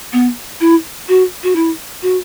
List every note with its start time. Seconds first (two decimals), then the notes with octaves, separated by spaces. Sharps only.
0.13 B3
0.61 E4
1.09 F#4
1.43 F#4
1.56 E4
2.03 F#4